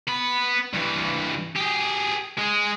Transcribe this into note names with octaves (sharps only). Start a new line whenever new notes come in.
B3 B5
G2 E3
G4 G#4
G#3 G#4